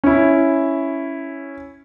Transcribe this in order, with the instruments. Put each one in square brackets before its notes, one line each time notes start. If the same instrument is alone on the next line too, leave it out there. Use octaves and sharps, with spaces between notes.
[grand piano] C#4 E4